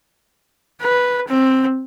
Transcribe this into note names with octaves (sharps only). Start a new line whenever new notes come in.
B4
C4